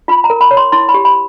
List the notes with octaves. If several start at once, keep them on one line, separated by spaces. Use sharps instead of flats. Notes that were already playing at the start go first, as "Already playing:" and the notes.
F4 B5
A#5
A#4
B5
C#5
C6
E4 C6
B5
G4
B5